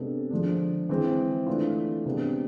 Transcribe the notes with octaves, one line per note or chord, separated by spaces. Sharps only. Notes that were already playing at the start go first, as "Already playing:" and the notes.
Already playing: C3 G#3 B3 D4 A4
D3 F3 G#3 D4
E3 G#3 C4
E3 A3 D4 F4
C3 G#3 B3 D4